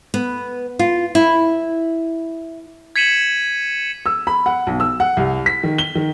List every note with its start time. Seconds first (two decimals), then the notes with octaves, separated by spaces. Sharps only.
0.14 B3
0.79 F4
1.15 E4
2.96 G#6 B6 C#7 D#7 E7 F#7
4.06 E6
4.27 B5
4.46 F#5
4.67 B1
4.80 E6
5.00 F#5
5.17 C2
5.46 B6
5.63 D#3
5.78 G7
5.95 D#3